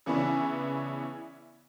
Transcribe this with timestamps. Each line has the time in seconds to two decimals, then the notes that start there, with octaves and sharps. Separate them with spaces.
0.06 C#3 E3 B3 C#4 D4 E4